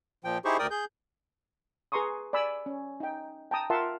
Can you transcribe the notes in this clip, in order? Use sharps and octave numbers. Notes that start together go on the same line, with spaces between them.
A#2 F3 G5
D#4 E4 G4 G#4 C5 C#6
D2 A#4 D5 G5 D#6
G#4 G6
G#4 B4 A#5 C6 C#6 D#6
D5 G#5 B5 E6
C#4
D#4 G5
G5 A5 A#5 D#6
F4 A#4 E5 F#5 A5 C6